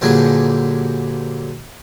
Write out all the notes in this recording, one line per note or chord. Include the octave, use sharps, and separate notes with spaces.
G2 A#2 D3 F#3 G#4